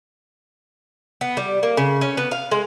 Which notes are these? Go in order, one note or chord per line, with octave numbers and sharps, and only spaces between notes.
B3
G3
A#3
C#3
C#4
B3
F5
G#3